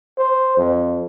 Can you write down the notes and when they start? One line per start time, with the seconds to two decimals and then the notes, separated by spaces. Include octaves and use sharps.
0.18 C5
0.57 F2